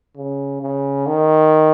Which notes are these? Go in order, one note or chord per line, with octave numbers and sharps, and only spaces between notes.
C#3
C#3
D#3